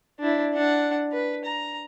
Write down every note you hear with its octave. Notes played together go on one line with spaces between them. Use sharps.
D4 E4
D4 F#5
B4
A#5